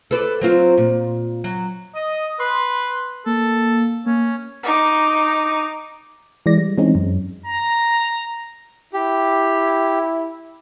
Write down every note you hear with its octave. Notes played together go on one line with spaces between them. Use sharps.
A4 B4 D5
F#3 C4 F4
A#2
F#3
D#5 D#6
B4 C6
A#3 A4
A#3 C#4
D#4 D6
E3 G#3 D5 A#6
G3
E3 G#3 C4 C#4 D#4
F#2
A#5
E4 G4